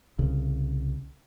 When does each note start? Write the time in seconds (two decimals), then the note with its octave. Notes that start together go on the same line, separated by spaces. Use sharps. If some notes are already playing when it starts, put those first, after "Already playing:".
0.19 C2 C#3